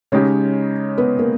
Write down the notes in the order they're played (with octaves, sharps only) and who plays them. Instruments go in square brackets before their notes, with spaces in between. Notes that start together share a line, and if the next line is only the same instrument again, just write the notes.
[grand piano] C#3 G#3 D#4 G4 [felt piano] C#4 C#5
[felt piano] B3 B4
A#3 A#4